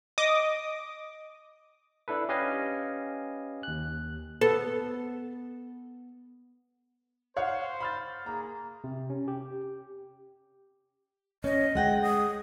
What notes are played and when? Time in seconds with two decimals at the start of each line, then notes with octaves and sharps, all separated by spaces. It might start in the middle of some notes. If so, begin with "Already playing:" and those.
0.18 D#5 D6 D#6
2.08 D4 E4 A4 B4
2.29 C#4 G4 B4 D#5 F5 G#5
3.63 D#2 F#6
4.41 B3 A4
7.37 C5 C#5 F5 F#5
7.80 B5 F6 A6
8.26 A#3 G#4 A#5
8.84 C3
9.10 C#4
9.28 G4
11.44 C#4 D#5
11.75 G#3 F#5 G5
12.03 D#6